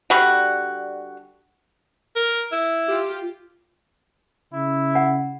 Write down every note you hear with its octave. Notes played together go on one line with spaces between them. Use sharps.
D3 G3 F#4
A#4
E4
F4 G4
C#3 E4
F#5